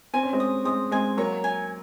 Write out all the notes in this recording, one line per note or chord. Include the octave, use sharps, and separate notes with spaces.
C4 G#5
C#4
G#3 C4
D#6
G#3 C4 D#6
G#3 C4 G#5
F#3 A#3 C#5
G#5